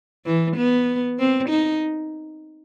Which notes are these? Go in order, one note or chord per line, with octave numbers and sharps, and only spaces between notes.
E3
B3
C4
D#4